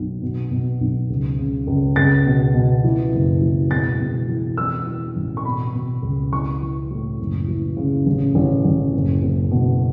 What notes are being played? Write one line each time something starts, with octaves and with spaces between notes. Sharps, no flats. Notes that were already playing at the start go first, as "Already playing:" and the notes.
Already playing: B1
B2
B2
B1
C#2
C#3
C#2
C#2 A6
B2
B2
E3
F#1
E3
E1 A6
E1
E3
E3 E6
E3
A1
C#6
B2 B5
B2
C#2
E3 C#6
E3
A2
F#1
E3
C#3
A1
A1
A1
F#1
F#1
B2